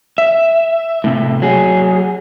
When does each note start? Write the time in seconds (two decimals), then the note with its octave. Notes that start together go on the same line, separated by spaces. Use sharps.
0.18 E5
1.04 A2 C3
1.42 F#3 G#4